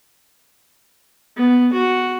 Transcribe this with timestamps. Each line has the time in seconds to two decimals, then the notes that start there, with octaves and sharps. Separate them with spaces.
1.37 B3
1.73 F#4